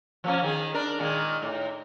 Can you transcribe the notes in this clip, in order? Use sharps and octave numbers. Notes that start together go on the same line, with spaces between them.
F3 A#3 C#4
D#3 G4 G#4
D4 A#4
A#2 D#3 G#3
A2